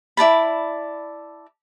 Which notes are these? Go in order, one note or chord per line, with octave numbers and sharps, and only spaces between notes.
E4 D5 A5 B5